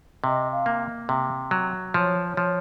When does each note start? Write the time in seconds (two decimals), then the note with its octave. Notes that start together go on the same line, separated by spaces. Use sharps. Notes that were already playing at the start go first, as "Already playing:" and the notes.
0.24 C3 D#5
0.52 F5
0.66 A#3
1.09 C3
1.51 F#3
1.94 F3 C#5
2.37 F3